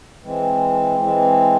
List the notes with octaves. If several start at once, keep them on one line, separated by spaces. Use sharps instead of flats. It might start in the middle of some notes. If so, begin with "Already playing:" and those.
E3 G#3 C4
E3 G#3 C4